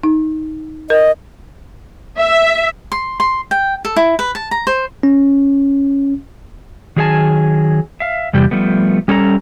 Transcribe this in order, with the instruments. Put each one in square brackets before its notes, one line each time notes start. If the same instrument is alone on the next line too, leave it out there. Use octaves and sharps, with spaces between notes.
[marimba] D#4
[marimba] A#4 [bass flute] D#5
[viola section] E5
[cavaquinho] C6
C6
G5
A4
E4
B4
A5
A#5
C5
[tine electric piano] C#4
[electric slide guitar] D#3 F#3 G#4 C#5 G#5 A5
E5 F5
E2 C3 G3 G4
F3 G3 A3 B3
G3 C#4 A4 G#5 A#5